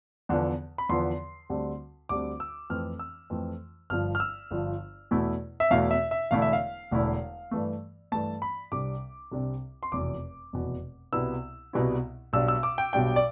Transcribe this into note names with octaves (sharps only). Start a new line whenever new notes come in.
E2 D3 F3 B3
B5
E2 D3 F3 B3 C6
D2 D3 G3 C4
D2 D3 G3 C4 D6
E6
F2 E3 A3 C4 F6
E6
F2 E3 A3 C4
G1 G2 F3 F6
F6
E6
G1 G2 F3
E2 B2 A3 E4
E5
E2 B2 A3 E4 F5
E5
E5
E1 E2 D3 A3 E4 F5
E5
F5
E1 E2 D3 A3 E4
G2 E3 A3
G2 E3 A3 A5
B5
C2 C3 G3 D4 D6
C2 C3 G3 D4
C6
F1 E2 B2 D6
F1 E2 B2
C2 B2 G3 B3 E4 E6
C2 B2 G3 B3 E4
B1 B2 G3 D4 E6
E6
D6
G5
B1 B2 G3 D4 G5
D5